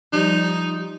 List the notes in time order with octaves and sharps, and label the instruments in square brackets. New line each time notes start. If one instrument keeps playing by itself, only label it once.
[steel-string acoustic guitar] F3 G3 [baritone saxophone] D#4